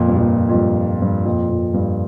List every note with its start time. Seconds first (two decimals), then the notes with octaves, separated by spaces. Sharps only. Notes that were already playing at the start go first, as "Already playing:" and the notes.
Already playing: F2 A#2
0.08 G2
0.17 F2 A#2
0.49 F2
0.54 G2
1.02 G2
1.25 F2 A#2
1.49 F2 A#2
1.74 G2